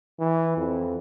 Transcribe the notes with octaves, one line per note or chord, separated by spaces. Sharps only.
E3
F2